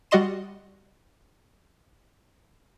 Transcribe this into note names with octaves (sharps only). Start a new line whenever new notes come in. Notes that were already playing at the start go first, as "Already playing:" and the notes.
G3 F#4 D5 D#5 C6 E7